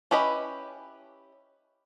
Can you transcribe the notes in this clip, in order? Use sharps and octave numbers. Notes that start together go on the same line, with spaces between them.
C#4 E4 G4 B4 D#5